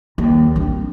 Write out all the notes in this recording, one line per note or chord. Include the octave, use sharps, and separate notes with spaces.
D#2
C4 D4